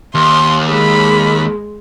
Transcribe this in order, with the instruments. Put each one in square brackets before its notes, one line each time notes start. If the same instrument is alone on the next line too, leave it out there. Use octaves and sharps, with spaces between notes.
[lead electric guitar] D#2 [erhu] C6
[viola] G#3 [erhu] B5